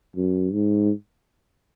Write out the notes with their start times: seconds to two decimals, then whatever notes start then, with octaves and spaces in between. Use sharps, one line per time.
0.16 F#2
0.53 G#2